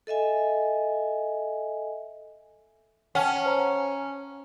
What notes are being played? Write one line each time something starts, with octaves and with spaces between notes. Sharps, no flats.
A4 D#5 E5 G#5
C#4 F#5 G5 A5
C5 A#5